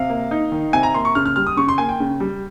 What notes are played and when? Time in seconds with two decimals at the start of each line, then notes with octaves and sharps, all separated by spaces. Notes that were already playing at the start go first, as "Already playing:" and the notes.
Already playing: C3 F5
0.09 A#3
0.31 D#4
0.52 D#3
0.73 C3 G#5
0.83 A#5
0.94 A#3 C6
1.05 C#6
1.15 C#3 F6
1.26 F6
1.36 G3 F6
1.47 D#6
1.57 C#3 C#6
1.69 C6
1.78 A#3 G#5
1.89 G5
2.00 C#3
2.20 G3